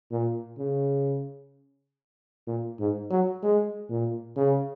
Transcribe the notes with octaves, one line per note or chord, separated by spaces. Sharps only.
A#2
C#3
A#2
G#2
F#3
G#3
A#2
C#3